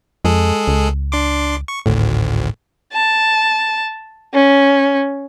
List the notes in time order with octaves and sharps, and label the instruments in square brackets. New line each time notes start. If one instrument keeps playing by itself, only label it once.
[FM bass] F2 [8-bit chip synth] G#3 G#4 A4
[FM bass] C#2
[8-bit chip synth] D4 C6 D6
C#6
[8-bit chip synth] G#1 D2 [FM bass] A2
[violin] A5
C#4